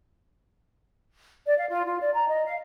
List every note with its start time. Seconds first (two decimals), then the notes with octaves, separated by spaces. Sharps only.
1.46 D5
1.57 F5
1.69 F4
1.85 F4
2.01 D5
2.14 A#5
2.27 D#5
2.45 F5